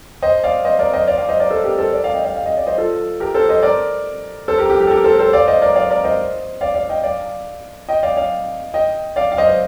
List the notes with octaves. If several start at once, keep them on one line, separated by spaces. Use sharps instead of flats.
C5 D#5
D5 F5
C5 D#5
A#4 D5
C5 D#5
D5 F5
D5 F5
C5 D#5
A#4 D5
A4 C5
G4 A#4
A4 C5
A#4 D5
D5 F5
D#5 G5
D5 F5
F5
D#5
D5
C5 D#5
F4 A4
G4 A#4
A4 C5
C5 D#5
A#4 D5
A4 C5
G4 A#4
G4
G4
A4
G4 A#4
A4 C5
A4 C5
D5 F5
C5 D#5
A#4 D5
D5 F5
A#4 D5
C5 D#5
D5 F5
D5 F5
D#5 G5
D5 F5
D#5 G5
D5 F5
D5 F5
D#5 G5
D5 F5
F5
C5 D#5
C5